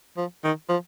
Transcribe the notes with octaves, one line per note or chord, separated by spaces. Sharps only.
F3
D#3
F3